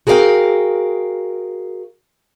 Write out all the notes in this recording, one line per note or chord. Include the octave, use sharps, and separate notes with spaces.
F#4 G#4 A#4 B4 F5 G5